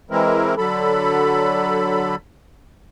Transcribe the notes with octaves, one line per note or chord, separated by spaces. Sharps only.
E3 G#3 C4 E4 A#4
D3 F#3 A4 B5